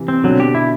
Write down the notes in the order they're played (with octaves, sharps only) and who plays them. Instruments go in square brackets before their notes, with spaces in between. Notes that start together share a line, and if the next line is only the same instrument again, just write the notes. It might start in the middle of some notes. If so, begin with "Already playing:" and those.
Already playing: [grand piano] C3 E3
[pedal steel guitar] C4
[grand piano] B2 D3 [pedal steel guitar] F#3
[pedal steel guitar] G4
E4